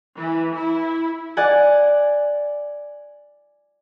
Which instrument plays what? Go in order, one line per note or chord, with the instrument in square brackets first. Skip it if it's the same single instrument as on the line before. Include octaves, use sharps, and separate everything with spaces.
[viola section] E3
E4
[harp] D5 F#5 G#5